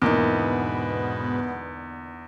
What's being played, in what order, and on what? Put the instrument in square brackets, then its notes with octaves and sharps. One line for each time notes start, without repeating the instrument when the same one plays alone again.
[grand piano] E2 [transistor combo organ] G#2 B2 B4 [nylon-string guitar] D3 A#3 D#4 [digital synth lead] B3